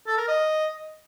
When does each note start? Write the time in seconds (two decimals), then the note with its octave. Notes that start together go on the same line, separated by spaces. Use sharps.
0.07 A4
0.18 A#4
0.28 D#5